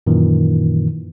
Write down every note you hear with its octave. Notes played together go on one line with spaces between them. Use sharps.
F#2 A#2 D#3 E3